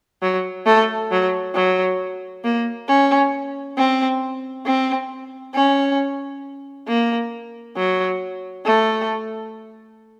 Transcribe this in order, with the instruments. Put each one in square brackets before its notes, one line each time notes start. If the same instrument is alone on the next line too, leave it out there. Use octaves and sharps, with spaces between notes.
[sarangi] F#3
A3
F#3
F#3
A#3
C#4
C4
C4
C#4
A#3
F#3
A3